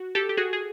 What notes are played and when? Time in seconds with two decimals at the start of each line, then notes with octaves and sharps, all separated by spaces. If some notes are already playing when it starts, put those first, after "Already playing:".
Already playing: F#4
0.15 G4 A4
0.29 G4
0.37 F#4 G#4
0.53 G#4